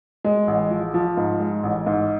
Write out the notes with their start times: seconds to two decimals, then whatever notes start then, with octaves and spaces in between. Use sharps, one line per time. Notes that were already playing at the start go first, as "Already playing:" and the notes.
0.24 G#3
0.47 A1
0.71 F3
0.94 F3
1.17 G#2
1.40 G#3
1.63 A1
1.86 G#2